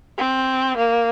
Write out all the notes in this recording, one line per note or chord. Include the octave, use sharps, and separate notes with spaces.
C4
A#3